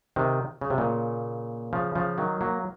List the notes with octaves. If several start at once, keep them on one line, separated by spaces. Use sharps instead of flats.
C3 D#3
C#3
C3
A#2 C#3
C#3 F3
C#3 F3
D#3 F#3
F#3 A#3